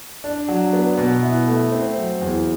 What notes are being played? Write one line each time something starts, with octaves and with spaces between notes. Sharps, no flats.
D4
F#3
B3
B2
E4
A3
C4
F#3
E2